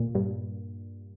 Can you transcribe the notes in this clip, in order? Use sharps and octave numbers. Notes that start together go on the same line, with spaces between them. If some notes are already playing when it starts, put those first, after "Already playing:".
Already playing: A#2
G2